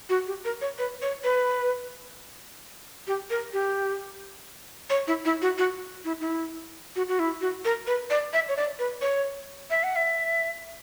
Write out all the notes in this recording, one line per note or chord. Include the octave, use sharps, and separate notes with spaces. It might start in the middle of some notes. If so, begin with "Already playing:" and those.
F#4
G4
A#4
C#5
B4
C#5
B4
G4
A#4
G4
C#5
E4
E4
F#4
F#4
E4
E4
F#4
F#4
E4
F#4
A#4
B4
D5
E5
C#5
D5
B4
C#5
E5
F#5
E5